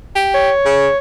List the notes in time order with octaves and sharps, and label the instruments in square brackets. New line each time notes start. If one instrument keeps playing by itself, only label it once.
[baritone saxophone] G4
[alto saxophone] C#5
[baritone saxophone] C#3